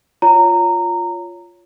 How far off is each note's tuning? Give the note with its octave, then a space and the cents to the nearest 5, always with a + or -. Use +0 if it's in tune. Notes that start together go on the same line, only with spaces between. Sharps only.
F4 +0 C#5 +15 A#5 -15